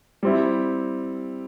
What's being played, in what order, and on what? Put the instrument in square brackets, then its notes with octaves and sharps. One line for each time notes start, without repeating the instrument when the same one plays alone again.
[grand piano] G3 C4 E4